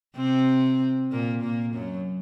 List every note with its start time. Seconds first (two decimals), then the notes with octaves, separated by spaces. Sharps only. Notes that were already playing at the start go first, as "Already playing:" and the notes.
0.17 C3 C4
1.12 A#2 A#3
1.43 A#2 A#3
1.75 F#2 F#3